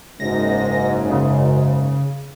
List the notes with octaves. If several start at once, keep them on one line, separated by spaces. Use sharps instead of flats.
F#1 G#2 A#6
C#3